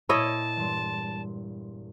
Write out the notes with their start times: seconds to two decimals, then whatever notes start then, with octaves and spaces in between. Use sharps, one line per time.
0.09 A#2 E4 C#5 D#5 A5 A#6
0.57 E1 G2 C6